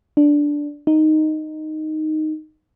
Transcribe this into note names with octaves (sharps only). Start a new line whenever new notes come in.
D4
D#4